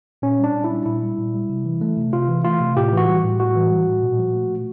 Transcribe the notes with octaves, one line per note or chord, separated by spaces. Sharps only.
A#2 C#4
G3 D4
A#2
E4
G3
A#2 E4
G3
A#2
G3
C3
E3
A3
C3
C3 F4
E3
A3 F4
C3
A2 G4
E3 F#4
G3
A2
A2 F#4
E3
G3
A2
A#2
F3
A3
A#2